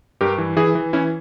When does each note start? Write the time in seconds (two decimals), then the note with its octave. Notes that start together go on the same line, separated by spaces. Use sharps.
0.21 G2 G4 A#4
0.38 E3
0.57 E3 E4 G#4
0.75 E3
0.93 E3 C#4 E4